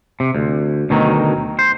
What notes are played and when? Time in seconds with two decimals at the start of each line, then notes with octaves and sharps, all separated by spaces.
0.20 C3
0.35 D2
0.90 D2 B2 D#3 F#3
1.59 C5